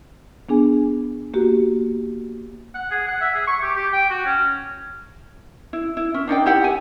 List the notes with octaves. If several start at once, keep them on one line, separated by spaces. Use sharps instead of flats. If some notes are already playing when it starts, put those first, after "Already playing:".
B3 D4 G#4 G#5
A#3 F#4 G4
F#5
G#4
F#5
E5
G#4
C#6
G4
G4
G5
F#4
C#4
E4
E4
C#4
D4 D#4 D5 G5
E4 G4 F#5
G#5